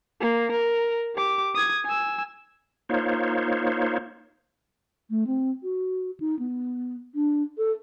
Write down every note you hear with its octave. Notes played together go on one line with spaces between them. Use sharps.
A#3
A#4
G4 D6
D#6 G#6
G#5 E6
A#3 D#4 F4 C5 C#5
A3
C4
F#4
D#4
B3
D4
A4